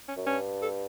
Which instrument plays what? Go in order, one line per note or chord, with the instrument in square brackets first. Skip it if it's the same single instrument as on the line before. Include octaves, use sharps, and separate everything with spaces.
[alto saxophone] C#4
[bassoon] F#2
[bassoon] G2 [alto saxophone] C#4
[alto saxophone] A4